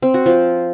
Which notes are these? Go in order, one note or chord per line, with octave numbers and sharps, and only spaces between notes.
C4
F#4
F3